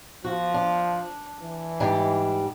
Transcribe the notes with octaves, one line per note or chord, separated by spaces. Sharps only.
F3 F#4
D4
E3
G#2 G3 D4